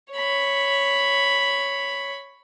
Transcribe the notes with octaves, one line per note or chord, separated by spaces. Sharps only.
C#5 B5